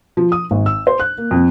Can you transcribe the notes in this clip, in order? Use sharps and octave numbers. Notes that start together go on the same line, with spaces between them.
F3
D#6
G#1
E6
C5
F#6
A#3
F2